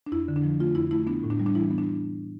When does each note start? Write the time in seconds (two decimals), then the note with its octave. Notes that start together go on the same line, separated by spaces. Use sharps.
0.06 D4
0.12 F2 E4
0.28 D3
0.36 D4
0.44 F3
0.60 A3 F4
0.75 F2 E4
0.91 A3 E4
1.07 B3 D4
1.23 A2
1.30 D4
1.40 G3
1.46 D4
1.55 E3 E4
1.71 B3
1.78 D4